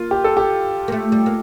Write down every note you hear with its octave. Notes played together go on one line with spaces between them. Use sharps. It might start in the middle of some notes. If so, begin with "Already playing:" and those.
Already playing: A#3 F4
G4
A4
G4
A#3
A3
G3
A#3